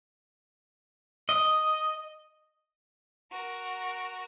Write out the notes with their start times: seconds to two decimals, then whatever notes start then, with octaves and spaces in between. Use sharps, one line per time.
1.29 D#5
3.31 F#4 A#4